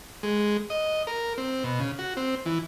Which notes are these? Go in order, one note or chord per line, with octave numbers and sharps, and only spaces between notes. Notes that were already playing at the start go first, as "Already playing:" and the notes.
G#3
D#5
A#4
C4
B2
C#3
F#4
C4
E3